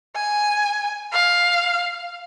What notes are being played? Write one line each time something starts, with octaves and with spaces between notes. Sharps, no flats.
G#5
F5